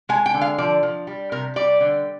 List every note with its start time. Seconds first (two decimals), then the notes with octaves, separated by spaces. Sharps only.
0.09 G#3 G#5
0.26 G5
0.34 D3
0.41 F5
0.58 F3 D5
0.83 F3
1.07 G3
1.32 C3 A#4
1.56 G3 D5
1.81 D3